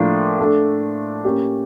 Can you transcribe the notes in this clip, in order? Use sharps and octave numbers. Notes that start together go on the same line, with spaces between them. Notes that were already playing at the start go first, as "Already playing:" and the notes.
Already playing: A2 F3 A#3 D4 F4
A3 D4 A4
A#3 C#4 G4